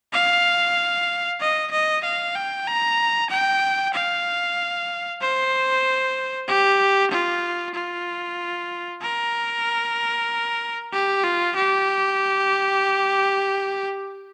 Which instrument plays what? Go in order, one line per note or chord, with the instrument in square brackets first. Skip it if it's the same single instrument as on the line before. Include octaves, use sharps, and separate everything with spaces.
[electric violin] F5
D#5
D#5
F5
G5
A#5
G5
F5
C5
G4
F4
F4
A#4
G4
F4
G4